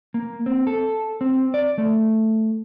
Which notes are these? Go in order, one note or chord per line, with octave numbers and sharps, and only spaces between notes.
A#3
C4
A4
C4
D5
A3